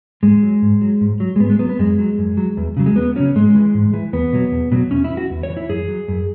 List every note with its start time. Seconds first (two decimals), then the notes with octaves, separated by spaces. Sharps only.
0.23 G#2 G#3
0.43 F#3
0.62 G#2
0.81 F#3
1.01 G#2
1.20 F#3
1.36 G#3
1.40 G#2 B3
1.50 G#3
1.59 F#3 B3
1.69 B3
1.79 F#2 G#3
1.99 F#3
2.18 F#2
2.37 F#3
2.57 E2
2.77 C#3 F#3
2.86 G#3
2.96 E2 B3
3.16 C#3 F#3 C#4
3.35 G#2 G#3
3.55 E3
3.74 G#2
3.93 E3
4.13 E2 B3
4.33 B2 F#3
4.52 E2
4.72 B2 F#3
4.91 E2 C#4
5.04 E4
5.10 E3
5.17 F#4
5.30 E2
5.43 C#5
5.50 E3
5.57 E4
5.69 F#2 G#4
5.88 F#3
6.08 F#2